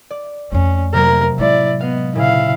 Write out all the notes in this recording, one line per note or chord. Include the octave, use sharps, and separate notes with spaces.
D5
F2 A3 C#4
C3 F#3 A#3 A#4
A2 G#3 E4 D5
B3 D#5 F5
A#2 C#3 E4 F5